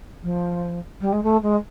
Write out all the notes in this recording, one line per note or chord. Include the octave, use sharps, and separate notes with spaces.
F3
G3
G#3
A3
G#3